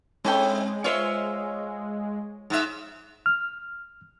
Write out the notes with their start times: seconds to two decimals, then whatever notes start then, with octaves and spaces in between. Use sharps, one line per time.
0.25 G#3 C4 E4 A4 G5
0.84 F4 C5 C#5 E5
2.50 G#2 E5
3.26 F6